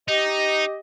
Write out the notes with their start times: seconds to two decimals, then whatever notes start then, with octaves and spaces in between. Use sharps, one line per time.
0.08 D#4 G4 D#5